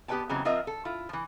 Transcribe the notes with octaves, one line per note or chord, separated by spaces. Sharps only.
B3 G4 B4 C#5 G5 A5
C#3 E3 F#3 G#3 C4
F3 C4 F4 A#4 D#5 E5
A4
E4 F4
E3 F3